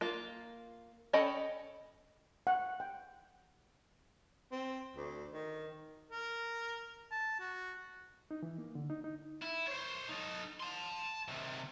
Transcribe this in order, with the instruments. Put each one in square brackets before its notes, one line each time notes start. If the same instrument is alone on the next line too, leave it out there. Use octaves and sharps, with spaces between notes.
[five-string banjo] A#3 F4
C#4 A4 D#5 G5 B5
[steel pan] F#5
G5
[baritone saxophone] C4
D2
D#3
[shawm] A#4
A5
F#4
[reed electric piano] D#4
E3
A#3
D3
D#4
D#4
[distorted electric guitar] E4
C5 C#5
D#4 A4
A5 C6
C3 D#3